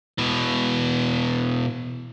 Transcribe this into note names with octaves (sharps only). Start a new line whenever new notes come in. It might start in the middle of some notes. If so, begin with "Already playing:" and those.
B2 E3